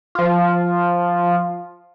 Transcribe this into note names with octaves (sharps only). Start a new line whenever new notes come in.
F3 F4